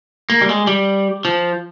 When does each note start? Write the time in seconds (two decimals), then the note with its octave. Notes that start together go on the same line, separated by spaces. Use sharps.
0.30 A#3
0.41 G3
0.49 G#3
0.67 G3
1.25 F3